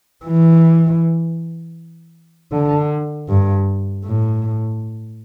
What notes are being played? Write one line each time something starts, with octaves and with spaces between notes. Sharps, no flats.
E3
D3
G2
A2